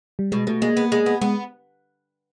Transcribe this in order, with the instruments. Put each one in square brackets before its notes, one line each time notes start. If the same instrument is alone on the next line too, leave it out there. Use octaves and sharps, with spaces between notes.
[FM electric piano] G3
[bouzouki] B2 [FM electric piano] G#3
[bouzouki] B2 [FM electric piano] A3
[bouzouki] G#3 [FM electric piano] A#3
[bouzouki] B3
G#3
B3
[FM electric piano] G#3 [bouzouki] B3